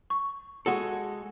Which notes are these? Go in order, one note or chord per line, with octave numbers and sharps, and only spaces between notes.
C#6
G#3 F#4 A4